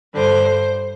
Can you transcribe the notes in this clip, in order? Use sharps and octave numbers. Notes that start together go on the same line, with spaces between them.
G2 D3 G3 C5